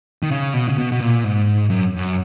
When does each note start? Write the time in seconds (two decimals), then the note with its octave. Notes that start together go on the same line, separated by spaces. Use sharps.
0.23 D#3
0.31 C#3
0.54 B2
0.68 C#3
0.78 B2
0.92 B2
1.01 A#2
1.24 G#2
1.70 F#2
1.96 F#2